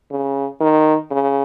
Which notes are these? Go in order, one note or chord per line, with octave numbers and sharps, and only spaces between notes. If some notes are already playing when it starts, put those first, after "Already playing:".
C#3
D#3
C#3